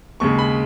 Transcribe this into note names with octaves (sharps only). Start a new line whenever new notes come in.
D#2 C#3 G#3 C#6
B5